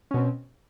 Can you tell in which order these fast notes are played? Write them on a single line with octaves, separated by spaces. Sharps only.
C#4 B2 C4